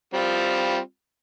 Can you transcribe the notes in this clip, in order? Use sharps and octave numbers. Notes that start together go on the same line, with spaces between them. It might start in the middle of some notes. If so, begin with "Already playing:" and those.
G3 C4 F4